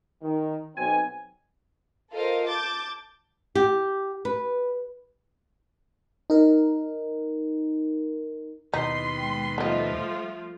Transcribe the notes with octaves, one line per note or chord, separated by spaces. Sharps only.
D#3
B1 C4 G#5
F4 A4 A#4 C5 D#5 F5
A5 D6 G6 A6
G4
B4
D#4 A#4
D#2 B2 D#4 E4 B4 C6
G#3 G5
F3 G3 A3 B3 F4 D#5 E5